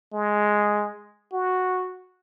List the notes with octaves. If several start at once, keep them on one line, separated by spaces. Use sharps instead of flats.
G#3
F#4